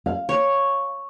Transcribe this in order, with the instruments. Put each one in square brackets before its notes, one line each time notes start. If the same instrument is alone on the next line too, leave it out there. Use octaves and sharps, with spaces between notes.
[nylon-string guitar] F5
[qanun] C#5